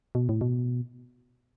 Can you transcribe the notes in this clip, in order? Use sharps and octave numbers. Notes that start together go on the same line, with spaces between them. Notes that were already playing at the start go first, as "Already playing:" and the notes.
B2
A2
B2